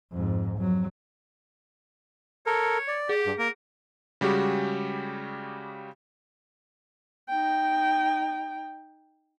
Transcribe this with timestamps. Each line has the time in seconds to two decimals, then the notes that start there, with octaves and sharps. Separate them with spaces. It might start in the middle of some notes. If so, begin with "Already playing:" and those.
0.12 F2 G#2
0.57 F2 F#3
2.46 A4 A#4 C#5
2.88 D5
3.09 G4 G#4
3.26 G2
3.39 A#3 A#4
4.21 C#3 G3 G#3 F#4 G4
7.29 D#4 G5